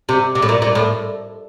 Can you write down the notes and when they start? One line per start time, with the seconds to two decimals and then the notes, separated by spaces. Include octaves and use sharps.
0.09 C3
0.35 C3
0.42 A2
0.49 A#2
0.62 A#2
0.75 A2